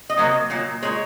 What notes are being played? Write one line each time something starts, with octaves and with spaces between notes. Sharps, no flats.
D#5
C3 F#3 A#3
A#2 F#3 A#3
A#2 G#3 C#5